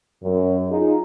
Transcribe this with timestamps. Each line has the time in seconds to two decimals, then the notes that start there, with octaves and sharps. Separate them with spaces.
0.23 F#2
0.70 D#4 F4 G#4